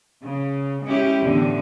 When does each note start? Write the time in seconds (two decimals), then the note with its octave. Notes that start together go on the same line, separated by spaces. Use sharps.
0.23 C#3
0.84 G#3 C#4 E4 G4
1.22 E2 A2 D3